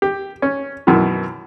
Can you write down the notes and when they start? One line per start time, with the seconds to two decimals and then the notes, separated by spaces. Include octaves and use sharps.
0.02 G4
0.42 C#4
0.87 F#2 B2 D#3 E3